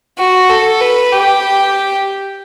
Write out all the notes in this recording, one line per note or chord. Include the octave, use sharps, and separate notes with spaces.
F#4
A4
B4
G4